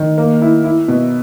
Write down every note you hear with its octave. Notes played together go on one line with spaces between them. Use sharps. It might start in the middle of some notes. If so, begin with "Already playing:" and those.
Already playing: D#3
A#3
E4
E4
B2